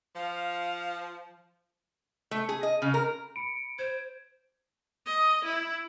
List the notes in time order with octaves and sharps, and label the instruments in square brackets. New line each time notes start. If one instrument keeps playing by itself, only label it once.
[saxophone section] F3 [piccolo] F5
[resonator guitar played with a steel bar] A3
G#4
D#5
C#3
A#4
[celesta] B5 C#7 [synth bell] D7
[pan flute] C5 [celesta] G#6
[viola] D#5
E4